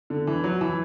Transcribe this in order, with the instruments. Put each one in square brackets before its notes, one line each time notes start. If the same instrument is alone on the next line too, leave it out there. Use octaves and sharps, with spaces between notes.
[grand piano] D3
E3
F#3
E3